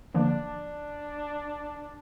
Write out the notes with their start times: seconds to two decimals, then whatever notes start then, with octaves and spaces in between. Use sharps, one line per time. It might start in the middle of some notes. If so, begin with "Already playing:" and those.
0.15 D3 F3 A#3 D4